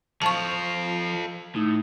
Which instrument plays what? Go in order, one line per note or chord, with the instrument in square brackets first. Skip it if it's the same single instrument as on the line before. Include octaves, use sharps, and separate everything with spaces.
[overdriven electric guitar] F3 F4 [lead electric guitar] A4 F5 [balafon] A5 C#6
[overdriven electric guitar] A2 [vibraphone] D#4